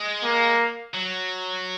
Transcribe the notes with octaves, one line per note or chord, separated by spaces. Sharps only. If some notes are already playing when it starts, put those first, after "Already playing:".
Already playing: G#3
A#3
F#3